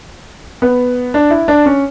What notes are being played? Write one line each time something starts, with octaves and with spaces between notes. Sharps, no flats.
B3
D4
E4
D4
C#4